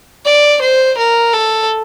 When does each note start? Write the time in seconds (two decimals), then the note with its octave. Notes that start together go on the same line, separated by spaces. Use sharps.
0.25 D5
0.62 C5
0.98 A#4
1.33 A4